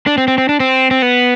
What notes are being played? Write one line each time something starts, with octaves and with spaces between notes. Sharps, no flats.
D4
C4
C4
C4
D4
C4
C4
B3